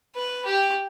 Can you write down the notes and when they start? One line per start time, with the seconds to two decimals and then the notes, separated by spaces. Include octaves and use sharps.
0.16 B4
0.45 G4